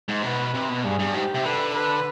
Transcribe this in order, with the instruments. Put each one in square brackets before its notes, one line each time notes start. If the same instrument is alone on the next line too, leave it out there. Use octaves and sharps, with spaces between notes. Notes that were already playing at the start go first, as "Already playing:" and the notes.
[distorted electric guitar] G#2
[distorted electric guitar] B2 [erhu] B4
[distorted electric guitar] C3
B2
[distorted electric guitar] G2 [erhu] G#4
[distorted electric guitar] G2
[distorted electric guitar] G#2 [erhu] G4
[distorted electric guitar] C3
[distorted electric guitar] D3 [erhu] B4
[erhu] B4